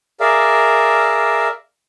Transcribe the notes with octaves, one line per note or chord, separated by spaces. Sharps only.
G#4 A#4 D5 E5 F5